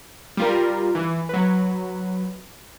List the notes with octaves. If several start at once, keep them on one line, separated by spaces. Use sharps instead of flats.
G3 F4 A#4
E3
F#3 B4